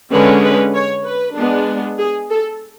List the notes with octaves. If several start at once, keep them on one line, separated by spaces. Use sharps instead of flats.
D3 G#3 C#4 B4
B4
C#5
B4
G#3 B3 D4
G#4
A4